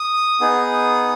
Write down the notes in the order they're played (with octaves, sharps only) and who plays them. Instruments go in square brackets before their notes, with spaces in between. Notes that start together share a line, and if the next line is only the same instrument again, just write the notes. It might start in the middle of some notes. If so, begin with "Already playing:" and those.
Already playing: [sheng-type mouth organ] D#6
B3 D#4 G#4